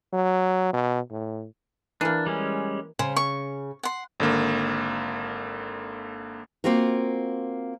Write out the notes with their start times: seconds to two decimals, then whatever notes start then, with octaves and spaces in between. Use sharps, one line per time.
0.13 F#3
0.73 B2
1.11 A2
2.01 E3 A#3 D4
2.26 G3 G#3 C#4
2.99 C#3 C5
3.16 C#6
3.83 F#5 C6
4.20 G#1 D3 A#3
6.64 A#3 C4 F4 F#4 A#4